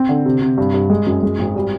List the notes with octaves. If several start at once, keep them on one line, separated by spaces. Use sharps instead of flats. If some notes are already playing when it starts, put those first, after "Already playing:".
Already playing: C4
D3
C3
C3
G2
G2
G#3
F#2
G#3
G#1
G3